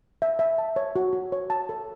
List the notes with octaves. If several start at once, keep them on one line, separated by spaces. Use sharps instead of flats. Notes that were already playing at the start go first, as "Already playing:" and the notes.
E5
E5
A5
C#5
F#4
F#4
C#5
A5
A4